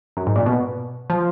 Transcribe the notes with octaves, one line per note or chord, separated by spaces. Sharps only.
F#2
G#2
A#2
B2
F3